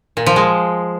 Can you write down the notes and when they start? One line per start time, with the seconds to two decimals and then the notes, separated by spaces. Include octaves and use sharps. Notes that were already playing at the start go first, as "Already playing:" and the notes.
0.17 A#2
0.26 F3
0.36 G#3